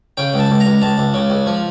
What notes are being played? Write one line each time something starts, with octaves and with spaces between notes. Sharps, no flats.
C#3 G5
C#2
A5
C#2
A#5
C#2
C#2 A5
C#2
C#3
C#2
F3